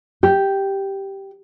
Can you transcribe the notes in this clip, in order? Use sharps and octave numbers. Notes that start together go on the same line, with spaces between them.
G4